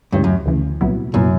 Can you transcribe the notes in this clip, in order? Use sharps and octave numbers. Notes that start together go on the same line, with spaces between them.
D2 G2 C#3 E3
F#2
D2 C#3 E3
C2 A#2 F#3 B3 E4
C2 F#2 A#2 F#3 B3 E4